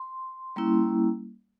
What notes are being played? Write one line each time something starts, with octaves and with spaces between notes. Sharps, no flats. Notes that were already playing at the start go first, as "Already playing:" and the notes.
Already playing: C6
G3 A#3 C#4 E4